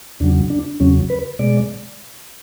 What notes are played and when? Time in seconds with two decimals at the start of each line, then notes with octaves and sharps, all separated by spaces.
0.20 E2 C#3 F#3 D4
0.50 D4
0.80 E2 C#3 F#3 C#4
1.10 B4
1.39 B2 G#3 D5